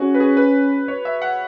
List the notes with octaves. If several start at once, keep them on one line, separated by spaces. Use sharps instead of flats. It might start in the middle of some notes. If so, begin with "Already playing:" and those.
Already playing: C#4 F#4 G#4
B4
G#4
B4
C#5
E5
F#5